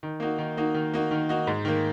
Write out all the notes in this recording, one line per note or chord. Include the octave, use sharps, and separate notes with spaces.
D#3
A#3 D#4 F#4
D#3
A#3 D#4 F#4
D#3
A#3 D#4 F#4
D#3
A#3 D#4 F#4
G#2
D#3 A#3